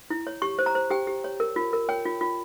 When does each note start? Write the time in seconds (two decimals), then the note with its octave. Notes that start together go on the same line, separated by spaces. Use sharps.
0.10 E4
0.27 C#5
0.42 G4 C#6
0.59 C5
0.66 A#5
0.75 C5
0.91 G4 G5
1.07 G4
1.24 C#5
1.40 A#4
1.56 F4
1.73 A#4
1.89 C#5 G5
2.05 F4
2.21 F4